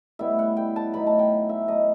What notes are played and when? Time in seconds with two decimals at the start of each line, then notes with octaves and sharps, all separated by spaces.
0.19 A2 G3 B3 E4 E5
0.39 F#5
0.57 G5
0.76 A5
0.94 A2 F#3 B3 D#4 B5
1.07 A5
1.19 G5
1.49 E5
1.68 A2 F#3 A3 D#5